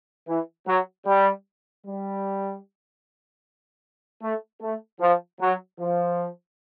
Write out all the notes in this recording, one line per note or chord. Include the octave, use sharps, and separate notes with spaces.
E3
F#3
G3
G3
A3
A3
F3
F#3
F3